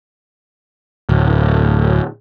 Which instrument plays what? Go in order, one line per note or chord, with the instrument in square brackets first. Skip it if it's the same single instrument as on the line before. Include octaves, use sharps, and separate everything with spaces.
[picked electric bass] D1